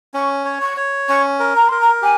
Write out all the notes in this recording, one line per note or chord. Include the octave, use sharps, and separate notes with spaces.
C#4 C#6
C#5
C#6
C#5
C#4 C#6
A#4
A#5
A#4 C6
A#5
G4 G#5